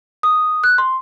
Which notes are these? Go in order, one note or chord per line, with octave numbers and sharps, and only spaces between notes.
D#6
F#6
C6